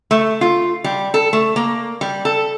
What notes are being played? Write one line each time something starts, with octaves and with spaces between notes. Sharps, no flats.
A3
F4
G3
A4
A3
A#3
G3
A4